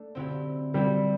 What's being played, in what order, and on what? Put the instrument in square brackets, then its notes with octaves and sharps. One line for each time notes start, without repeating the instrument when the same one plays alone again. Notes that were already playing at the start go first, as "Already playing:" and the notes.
Already playing: [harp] A3 D4
D3 F#3 C4 E4 G4
[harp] D3 F#3 C4 E4 G4 [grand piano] G3